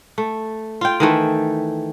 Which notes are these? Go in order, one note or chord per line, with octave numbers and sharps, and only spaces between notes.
A3
F4 G5
D#3 E3 A3